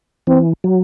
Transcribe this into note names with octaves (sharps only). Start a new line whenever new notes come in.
E3 C4
F#3